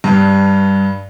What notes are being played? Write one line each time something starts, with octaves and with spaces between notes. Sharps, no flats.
G2